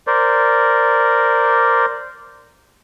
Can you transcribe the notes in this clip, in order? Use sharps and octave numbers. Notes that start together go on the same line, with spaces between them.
A#4 C5 D5